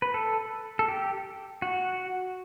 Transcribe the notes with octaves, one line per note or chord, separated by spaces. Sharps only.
B4
A4
A4
G4
F#4